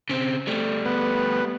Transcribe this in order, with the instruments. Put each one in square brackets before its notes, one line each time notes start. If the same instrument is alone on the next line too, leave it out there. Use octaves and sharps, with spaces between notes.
[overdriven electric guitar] C#3 C4
G3 A3
[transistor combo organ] B3